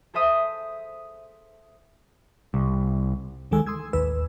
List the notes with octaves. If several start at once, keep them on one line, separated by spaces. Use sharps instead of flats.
G#4 A4 C5 E5 D#6 E6
C2
D2 D#3 G#3 A4 G#5 E6
C6 D#6 E6 G#6
A1 D#2 B4 E6